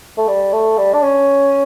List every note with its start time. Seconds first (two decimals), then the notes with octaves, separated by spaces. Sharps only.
0.18 A3
0.28 G3
0.53 A3
0.77 G3
0.94 D4
1.02 C#4